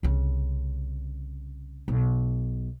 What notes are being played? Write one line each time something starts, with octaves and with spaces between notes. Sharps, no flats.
C2 C#3
B1